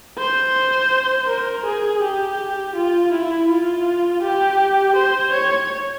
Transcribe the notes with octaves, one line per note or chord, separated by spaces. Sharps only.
C5
A#4
G#4
G4
F4
E4
F4
G4
C5
C#5